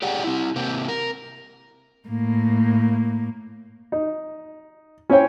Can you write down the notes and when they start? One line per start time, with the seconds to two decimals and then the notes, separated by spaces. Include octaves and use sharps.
0.02 G4 G#4 C#5 D5 F#5 G5
0.24 C4 E4
0.56 C3 A#3 C4
0.88 A#4
2.08 A2 A#3
3.92 D#4
5.10 C#4 E4 C5 C#5 G5